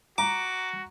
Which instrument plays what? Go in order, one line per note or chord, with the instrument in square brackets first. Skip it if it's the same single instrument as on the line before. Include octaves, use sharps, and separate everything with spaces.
[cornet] F#4 [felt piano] A#5 [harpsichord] D6